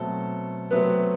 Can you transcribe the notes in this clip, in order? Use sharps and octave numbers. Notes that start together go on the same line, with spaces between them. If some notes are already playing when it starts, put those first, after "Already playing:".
Already playing: B2 F#3 A3 C4 A4
C3 F#3 A3 B3 C4 B4